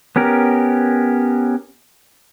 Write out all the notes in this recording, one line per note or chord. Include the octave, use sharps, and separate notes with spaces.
B3 C#4 G4 A#4